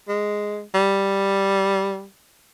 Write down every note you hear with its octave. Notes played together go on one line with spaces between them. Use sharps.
G#3
G3